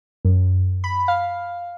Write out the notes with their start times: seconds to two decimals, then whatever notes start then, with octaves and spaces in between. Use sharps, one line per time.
0.25 F#2
0.84 B5
1.08 F5